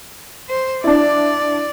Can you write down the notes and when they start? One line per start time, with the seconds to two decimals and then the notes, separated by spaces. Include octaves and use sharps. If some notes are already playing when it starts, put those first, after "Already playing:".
0.49 C5
0.84 D4 E4 D5